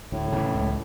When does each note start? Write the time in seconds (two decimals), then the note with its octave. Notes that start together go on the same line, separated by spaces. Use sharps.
0.12 D2 A2
0.32 C#3 E3
0.54 C#2